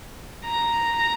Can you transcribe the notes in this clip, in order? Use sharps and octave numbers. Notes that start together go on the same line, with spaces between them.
A#5